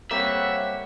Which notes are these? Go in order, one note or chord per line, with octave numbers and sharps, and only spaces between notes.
G3 A#3 C4 C#5 E5 F#5